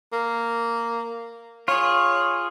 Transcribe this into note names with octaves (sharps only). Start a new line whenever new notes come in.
A#3
F4 G#4 C#5